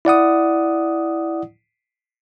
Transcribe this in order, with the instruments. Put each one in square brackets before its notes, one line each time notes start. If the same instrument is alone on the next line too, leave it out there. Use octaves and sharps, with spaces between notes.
[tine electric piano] E4 D5 F#5 D#6